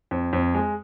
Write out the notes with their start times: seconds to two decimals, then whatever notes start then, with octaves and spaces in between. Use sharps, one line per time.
0.11 F2
0.33 F2
0.54 G#3